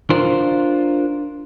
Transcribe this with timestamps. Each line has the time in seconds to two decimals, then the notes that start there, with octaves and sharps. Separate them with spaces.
0.10 D4 F4 A#4 C5